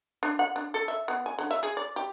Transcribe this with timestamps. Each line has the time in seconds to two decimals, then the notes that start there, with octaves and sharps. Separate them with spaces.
0.23 D4
0.39 F#5
0.56 D4
0.74 A4
0.88 E5
1.08 B3
1.26 G#5
1.39 D3
1.51 E5
1.63 G#4
1.77 D5
1.96 G4